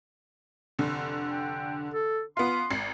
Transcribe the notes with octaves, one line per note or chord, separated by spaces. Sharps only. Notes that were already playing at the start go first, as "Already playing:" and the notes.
F1 D3
G5
A4
B3 F4 C6
G#1 C7